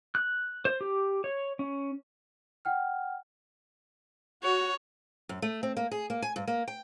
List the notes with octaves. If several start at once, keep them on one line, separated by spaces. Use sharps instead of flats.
F#6
C5
G4
C#5
C#4
F#5 G5 F6
F#4 C#5
F#2
A3
C4
A#3
G#4
A#3
G#5
G2
A#3
G5